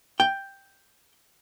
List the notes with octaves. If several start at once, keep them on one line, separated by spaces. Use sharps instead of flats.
G5